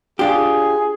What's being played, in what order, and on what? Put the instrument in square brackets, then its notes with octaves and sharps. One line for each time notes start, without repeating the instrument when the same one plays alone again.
[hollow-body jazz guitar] D4 F4 G4 [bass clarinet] G#4